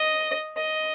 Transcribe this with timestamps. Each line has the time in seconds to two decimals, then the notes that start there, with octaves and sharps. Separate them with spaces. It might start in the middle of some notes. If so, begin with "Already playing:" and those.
Already playing: D#5
0.56 D#5